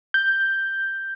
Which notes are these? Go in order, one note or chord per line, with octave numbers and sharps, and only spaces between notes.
G6